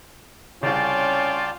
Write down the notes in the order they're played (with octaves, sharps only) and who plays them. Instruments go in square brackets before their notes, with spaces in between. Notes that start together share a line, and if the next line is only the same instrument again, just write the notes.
[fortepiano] C2 C#3 [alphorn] C#4 [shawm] F4 [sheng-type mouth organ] D5 G5 A5